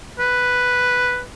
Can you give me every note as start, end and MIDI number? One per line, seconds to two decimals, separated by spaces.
0.19 1.22 71